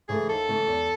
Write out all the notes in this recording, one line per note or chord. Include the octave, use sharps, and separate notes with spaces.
C#3 E3 A3 G#4
D#2 A4
C#3 E3 A3
E2